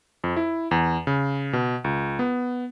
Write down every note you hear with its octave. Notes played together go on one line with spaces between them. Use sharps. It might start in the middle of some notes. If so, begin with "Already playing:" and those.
F2
E4
E2
C#3
B2
C#2
B3